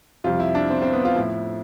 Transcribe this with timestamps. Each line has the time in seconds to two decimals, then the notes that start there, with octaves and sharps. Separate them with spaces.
0.24 F2 C3 G3 F4
0.40 E4
0.55 D4
0.70 C4
0.82 C4
0.93 B3
1.05 F4
1.16 A2 F3 E4